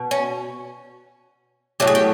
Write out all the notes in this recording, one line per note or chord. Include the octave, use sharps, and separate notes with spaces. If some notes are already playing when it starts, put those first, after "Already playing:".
Already playing: B2
C#4
A2 F#3 A3 G4
G#4
G4